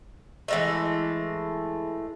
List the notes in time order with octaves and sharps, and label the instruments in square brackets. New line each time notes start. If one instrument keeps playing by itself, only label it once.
[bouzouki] E3 G#3 A3